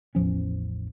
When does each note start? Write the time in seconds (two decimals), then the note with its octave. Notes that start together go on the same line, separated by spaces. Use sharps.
0.15 A1 E2 F3 C#4